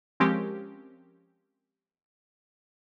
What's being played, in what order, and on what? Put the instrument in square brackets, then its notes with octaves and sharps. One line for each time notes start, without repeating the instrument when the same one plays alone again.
[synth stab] F3 G#3 C4 C#4 G4 A#4